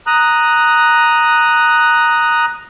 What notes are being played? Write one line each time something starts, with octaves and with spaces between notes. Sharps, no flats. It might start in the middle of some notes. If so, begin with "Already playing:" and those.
A#5 D#6 F#6